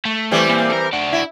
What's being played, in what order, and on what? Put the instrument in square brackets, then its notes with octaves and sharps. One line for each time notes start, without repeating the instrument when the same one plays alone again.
[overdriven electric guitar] A3
[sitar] E3 G3 C4
[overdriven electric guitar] A#2
A4 A#4
D4 F#4
[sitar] E4